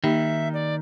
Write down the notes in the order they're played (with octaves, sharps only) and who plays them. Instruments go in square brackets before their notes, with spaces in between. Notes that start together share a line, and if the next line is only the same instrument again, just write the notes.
[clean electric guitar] D#3 [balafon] A#3 D#4 G4 [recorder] E5
[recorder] D5